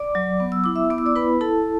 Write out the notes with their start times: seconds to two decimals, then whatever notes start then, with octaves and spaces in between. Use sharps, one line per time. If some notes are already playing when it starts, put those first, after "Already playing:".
Already playing: D5 D6
0.15 F#3
0.40 B3
0.52 E6
0.64 E4 D6
0.76 E5 E6
0.90 B3 D6
0.98 E6
1.06 D5 D6
1.16 E4 B4 B5
1.41 E4 A4 A5